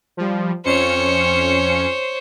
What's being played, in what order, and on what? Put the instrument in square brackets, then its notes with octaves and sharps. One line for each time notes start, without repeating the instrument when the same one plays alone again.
[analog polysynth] F3 G3
[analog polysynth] F2 C#4 C#7 [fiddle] C5 C#5